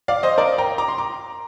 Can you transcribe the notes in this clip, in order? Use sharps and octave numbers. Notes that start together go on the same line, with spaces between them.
D5 F5
C5 D#5
A#4 D5
G5 A#5
A#5 D6
C6
A#5 D6